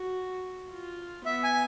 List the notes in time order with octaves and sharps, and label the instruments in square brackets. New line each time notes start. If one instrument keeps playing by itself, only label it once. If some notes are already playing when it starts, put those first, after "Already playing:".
Already playing: [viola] F#4
F4
[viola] B3 [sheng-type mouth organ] E5
[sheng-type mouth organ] G#5